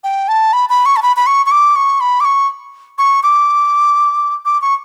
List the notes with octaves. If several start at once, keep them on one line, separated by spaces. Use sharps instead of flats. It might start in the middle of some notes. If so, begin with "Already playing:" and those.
G5
A5
B5
B5
C#6
A5
B5
B5
C#6
C#6
D6
C#6
B5
D6
C#6
C#6
D6
D6
C#6